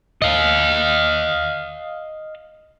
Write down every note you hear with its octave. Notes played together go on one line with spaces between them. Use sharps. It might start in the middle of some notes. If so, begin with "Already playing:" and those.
D#5 F5